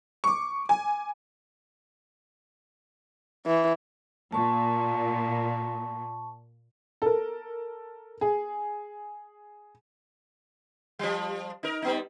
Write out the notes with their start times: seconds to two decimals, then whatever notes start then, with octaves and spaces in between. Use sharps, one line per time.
0.24 C#6 D6
0.69 G#5
3.47 E3
4.33 A#2 A5 C#6
7.02 A4 A#4
8.21 G#4
10.99 F3 G3
11.63 D#4 A#4
11.82 G3 B3 D#4